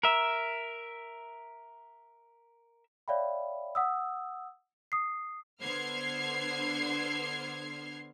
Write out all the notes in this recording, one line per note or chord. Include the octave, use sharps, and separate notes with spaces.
A#4 E5
C#5 D5 E5 F5 G5 B5
F#5 D#6 E6
D#6 C7
D3 B3 C5 F6 G#6 C7